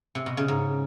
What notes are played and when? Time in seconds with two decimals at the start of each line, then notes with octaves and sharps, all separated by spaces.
0.15 C3
0.26 B2
0.37 C#3
0.48 G#2